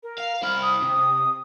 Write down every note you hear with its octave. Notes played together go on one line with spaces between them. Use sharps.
A#4
F5
C2 E4 F6
D#6
C3